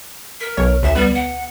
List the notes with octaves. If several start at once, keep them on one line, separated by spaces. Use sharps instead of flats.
A#4 B6
B1 C#5
D2 E5 E7
G3 B3
F#5